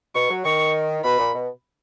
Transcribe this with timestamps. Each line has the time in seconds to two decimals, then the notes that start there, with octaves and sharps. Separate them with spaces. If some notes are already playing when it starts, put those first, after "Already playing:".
0.15 B2 C#6
0.30 F#3
0.45 D#3 C#6
1.04 B2 B5
1.19 A#2
1.35 B2